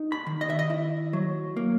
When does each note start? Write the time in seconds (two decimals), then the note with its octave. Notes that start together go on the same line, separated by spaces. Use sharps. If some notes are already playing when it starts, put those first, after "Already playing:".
Already playing: D#4
0.12 B5
0.26 D#3
0.41 D#5
0.50 E5
0.59 D#5
0.70 E4
1.13 F#3
1.57 A#3